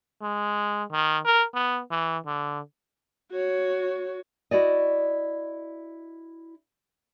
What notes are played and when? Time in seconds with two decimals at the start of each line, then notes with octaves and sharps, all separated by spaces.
0.22 G#3
0.92 D#3
1.25 A#4
1.55 B3
1.91 E3
2.26 D3
3.31 F#4 C#5
4.51 E4 F#4 D5 D#5